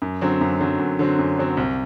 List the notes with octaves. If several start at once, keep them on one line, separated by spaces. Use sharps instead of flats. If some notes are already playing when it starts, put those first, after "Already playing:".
F#2
D3 F#3 C4
F#2
D3 F#3 C4
F#2
D3 F#3 C4
F#2
D3 F#3 C4
C2